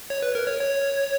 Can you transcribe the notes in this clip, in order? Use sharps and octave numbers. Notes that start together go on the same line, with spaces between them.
C#5
B4
A#4
C#5
C#5